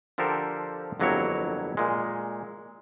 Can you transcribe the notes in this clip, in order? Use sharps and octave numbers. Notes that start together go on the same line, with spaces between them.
D3 F3 G4 A4 A#4 C5
G1 F2 F#3 A#3 E4 C#5
A#2 G#3